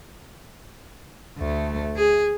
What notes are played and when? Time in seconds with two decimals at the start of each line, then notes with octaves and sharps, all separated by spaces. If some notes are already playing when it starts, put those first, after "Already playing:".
1.38 D2 A3
1.96 G#4